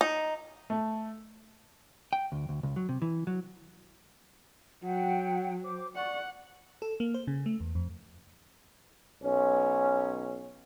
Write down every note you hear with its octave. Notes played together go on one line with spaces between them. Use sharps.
D#4
A3
G5
D2
D2
C#2
F#3
C3
E3
F#3
F#3 F#5 G5
C5 D6
D5 F#5 C#6
A4
A#3
C5
C#3
A3
E2
F2
B1 C#4